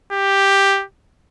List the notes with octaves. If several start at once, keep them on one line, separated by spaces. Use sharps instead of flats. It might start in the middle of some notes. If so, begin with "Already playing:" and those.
G4